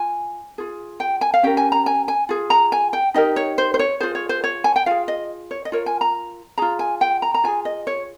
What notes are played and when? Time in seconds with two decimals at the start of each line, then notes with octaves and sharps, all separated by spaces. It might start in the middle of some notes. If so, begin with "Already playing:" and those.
Already playing: F4 G#5
0.58 F4 G#4
1.00 G5
1.21 G#5
1.34 F5
1.43 C#4 G4 A#4 G5
1.57 G#5
1.72 A#5
1.86 G#5
2.08 G#5
2.29 F4 G#4
2.50 A#5
2.72 G#5
2.93 G5
3.14 D#4 G4 A#4 D#5
3.36 C#5
3.58 C5
3.74 C5
3.79 C#5
4.00 F4 G#4 C5
4.15 C#5
4.29 C5
4.44 C#5
4.64 G#5
4.76 G5
4.86 F4 G#4 F5
5.08 D#5
5.51 C#5
5.65 D#5
5.72 F4 A#4 C#5
5.86 G#5
6.01 A#5
6.58 F4 G#4 A#5
6.79 G#5
7.01 G5
7.22 A#5
7.34 A#5
7.44 F4 G#4 G#5
7.65 D#5
7.87 C#5